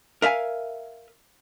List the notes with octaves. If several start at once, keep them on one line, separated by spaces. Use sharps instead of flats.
A#4 E5 F5 G#5